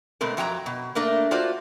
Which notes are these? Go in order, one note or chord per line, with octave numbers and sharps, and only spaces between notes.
B2 G#3 A3 C4 A#4
F2 F#3 G5 G#5 A#5
B2
A3 A#3 D4 A#4
F4 F#4 A4 C5 D5